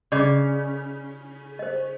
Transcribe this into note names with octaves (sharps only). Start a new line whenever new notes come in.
C#3 D5 D#5 D6
C5 D#5